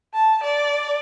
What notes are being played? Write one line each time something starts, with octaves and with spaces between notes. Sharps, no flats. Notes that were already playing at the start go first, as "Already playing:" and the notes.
A5
D5